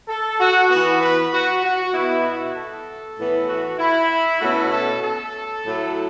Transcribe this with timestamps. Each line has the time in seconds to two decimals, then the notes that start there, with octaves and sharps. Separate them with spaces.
0.08 A4
0.39 F#4
0.70 E3 B3 F#4
1.01 B4
1.33 F#4
1.64 F#4
1.94 B2 B3 E4
2.24 F#4
2.55 A4
3.18 A2 E3 B3
3.48 F#4
3.79 E4
4.41 B2 A3 C#4 F#4
4.72 A4
5.03 A4
5.64 A2 F#3 A3